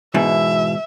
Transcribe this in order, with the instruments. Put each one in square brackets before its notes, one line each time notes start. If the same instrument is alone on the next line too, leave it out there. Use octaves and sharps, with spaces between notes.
[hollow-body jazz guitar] G#2 B2 E3 [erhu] E5